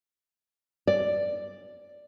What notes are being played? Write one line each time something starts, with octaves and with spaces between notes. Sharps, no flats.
D5